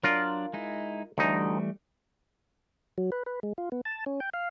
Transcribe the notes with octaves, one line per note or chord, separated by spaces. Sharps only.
F#3 D4 F4 A#4 D5
G#3 D#4 E4
D2 E3 G3 A3 D#4
F#3
B4
B4
G#3
F4
B3
A5
C#4
G5
F5